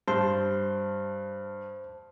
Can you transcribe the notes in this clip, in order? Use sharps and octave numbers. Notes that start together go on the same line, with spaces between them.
G2 C5 A5 C6